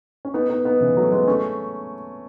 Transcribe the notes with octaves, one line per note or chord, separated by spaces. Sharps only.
C#4
B3 D#4
B3 D#4
B3 D#4
C#3 E3
F#3 A3
G#3 B3
A3 C#4